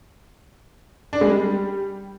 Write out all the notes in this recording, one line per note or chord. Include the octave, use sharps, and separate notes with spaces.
D4
G#3
G3